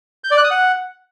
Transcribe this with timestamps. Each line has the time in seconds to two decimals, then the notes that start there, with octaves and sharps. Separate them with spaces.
0.24 G6
0.31 D5
0.37 F#6
0.44 D#6
0.51 F#5